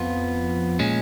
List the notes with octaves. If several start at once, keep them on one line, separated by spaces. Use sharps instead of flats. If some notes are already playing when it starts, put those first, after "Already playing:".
Already playing: F2 F3 B3 F4
A#2 G#3 C#4